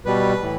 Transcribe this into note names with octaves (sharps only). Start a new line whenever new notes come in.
B2 G3 B4
A2 E3